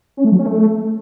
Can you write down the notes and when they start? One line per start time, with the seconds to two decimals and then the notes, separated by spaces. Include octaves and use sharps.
0.17 C#4
0.25 A3
0.32 F#3
0.39 C#4
0.46 A3